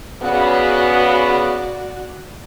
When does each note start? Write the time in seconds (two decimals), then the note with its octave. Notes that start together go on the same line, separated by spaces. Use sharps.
0.22 C#3 B3 F#4 D5